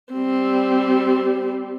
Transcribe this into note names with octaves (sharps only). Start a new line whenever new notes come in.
G3 C4